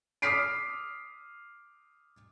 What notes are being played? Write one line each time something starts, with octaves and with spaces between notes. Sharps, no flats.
D6 D#6 F6 B6 C7 D7